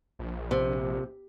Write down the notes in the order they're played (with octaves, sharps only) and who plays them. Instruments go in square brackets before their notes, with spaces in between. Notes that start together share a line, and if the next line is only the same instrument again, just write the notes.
[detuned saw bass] A#1
[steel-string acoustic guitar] C3